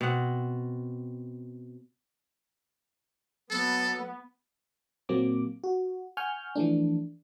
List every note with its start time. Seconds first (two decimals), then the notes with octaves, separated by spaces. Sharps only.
0.01 B2 C4 F#5
3.50 F#3 B3 A4
5.09 A#2 F#3 A#3 C4 D6
5.64 F#4
6.17 F#5 G#5 C#6 F6 G6
6.55 E3 F3 A3 D4